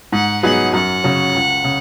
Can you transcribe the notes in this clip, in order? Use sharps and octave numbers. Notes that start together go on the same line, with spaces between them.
G#2 F#5
F#3 B3 D#4 G#4 F#5
F#2 F#5
C#3 F#3 C#4
C#2
C#3